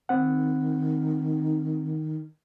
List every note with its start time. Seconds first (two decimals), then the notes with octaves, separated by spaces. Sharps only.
0.09 D#3 C4 F#5